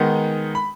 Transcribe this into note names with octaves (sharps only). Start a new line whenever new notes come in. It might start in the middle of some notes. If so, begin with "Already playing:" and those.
Already playing: D#3 G#3 B3 D#4
B5